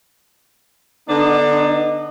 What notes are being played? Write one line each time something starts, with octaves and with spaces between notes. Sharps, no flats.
D3 B3 D4 D#4